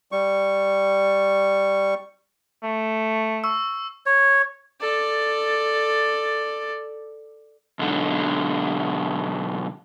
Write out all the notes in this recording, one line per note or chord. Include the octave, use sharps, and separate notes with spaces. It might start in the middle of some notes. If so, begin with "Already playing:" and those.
G3 C#6
A3
C#6 E6
C#5
A4 D5
B1 D3